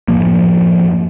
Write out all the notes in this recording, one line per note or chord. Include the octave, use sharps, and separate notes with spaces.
F#2 A2 F3 A#3